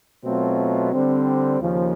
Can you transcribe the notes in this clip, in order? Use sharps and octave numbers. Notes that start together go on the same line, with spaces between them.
B2 F#3 A3 C4 F4
D3 G3 C4
D#2 C#3 F3 A#3